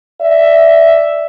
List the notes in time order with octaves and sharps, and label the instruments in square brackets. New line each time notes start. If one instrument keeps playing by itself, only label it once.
[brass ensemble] D5 E5